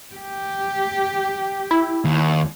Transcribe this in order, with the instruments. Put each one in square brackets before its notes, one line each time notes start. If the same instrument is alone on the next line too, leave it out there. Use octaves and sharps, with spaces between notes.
[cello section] G4
[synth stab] E4
[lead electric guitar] D#2